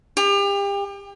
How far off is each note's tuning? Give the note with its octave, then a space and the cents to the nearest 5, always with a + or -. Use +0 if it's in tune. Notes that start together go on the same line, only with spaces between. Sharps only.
G4 +35